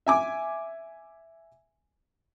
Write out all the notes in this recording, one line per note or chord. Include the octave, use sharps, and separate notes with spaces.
E5 G#5 D6